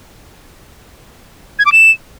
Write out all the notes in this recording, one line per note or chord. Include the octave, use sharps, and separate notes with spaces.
G#6
D6
E7